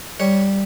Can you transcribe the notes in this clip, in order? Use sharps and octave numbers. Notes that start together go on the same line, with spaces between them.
G3 C#5